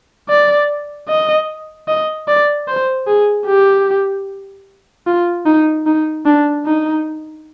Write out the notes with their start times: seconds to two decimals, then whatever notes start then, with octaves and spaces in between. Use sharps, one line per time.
0.29 D5
1.08 D#5
1.88 D#5
2.28 D5
2.68 C5
3.07 G#4
3.47 G4
5.07 F4
5.46 D#4
5.86 D#4
6.26 D4
6.66 D#4